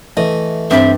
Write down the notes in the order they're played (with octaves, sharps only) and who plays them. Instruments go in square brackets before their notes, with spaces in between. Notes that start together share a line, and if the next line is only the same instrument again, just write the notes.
[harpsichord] E3 A3 [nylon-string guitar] D#5
[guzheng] G2 D5 B5 [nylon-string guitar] C4 C5 [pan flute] E5